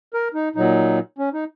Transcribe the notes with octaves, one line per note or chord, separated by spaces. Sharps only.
A#4
D#4
A#2 F#3 D#4
C#4
D#4